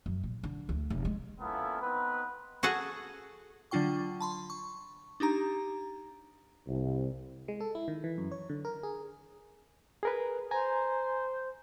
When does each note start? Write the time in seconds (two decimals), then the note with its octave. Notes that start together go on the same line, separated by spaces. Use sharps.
0.06 F#2
0.23 A#2
0.43 D3
0.69 D2
0.90 F1
1.05 G#3
1.41 A#3 B3 C#4 E4 F4 A4
1.81 B3 C4 D#4 B4
2.63 F#4 G#4 A4 F#5 A5
3.71 D3 F#3 D4 F4 G5 C#6
4.20 A5 B5 C6
4.50 C#6
5.20 D4 D#4 G4 A#5
6.68 C2
7.48 G#3
7.60 A4
7.75 E4
7.88 D#3
8.04 E3
8.18 F#2
8.32 C#5
8.50 D3
8.65 A#4
8.83 G#4
10.03 G#4 A#4 B4
10.51 C5 G#5 A#5